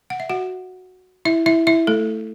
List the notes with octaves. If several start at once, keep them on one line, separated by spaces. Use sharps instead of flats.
F#5
E5
F#4 F#5
E4 E5
E4 E5
E4 E5
A3 A4